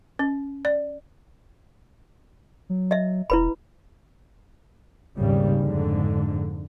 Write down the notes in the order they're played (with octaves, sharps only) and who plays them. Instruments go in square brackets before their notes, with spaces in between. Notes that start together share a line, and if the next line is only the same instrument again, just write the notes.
[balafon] C#4
D5
[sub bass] F#3
[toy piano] D#5 E5
[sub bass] E1 [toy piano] E4 B4 B5
[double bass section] G#1 D#2 G#2 C#3 G3
F2 G#2 D3